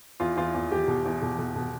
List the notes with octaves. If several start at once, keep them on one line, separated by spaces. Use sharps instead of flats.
E2 F4
E2 F4
E2
E2 G4
B2
E2
B2
B2
B2